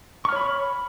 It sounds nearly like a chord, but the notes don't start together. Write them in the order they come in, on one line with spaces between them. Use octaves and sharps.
C#6 F6 C#5 B5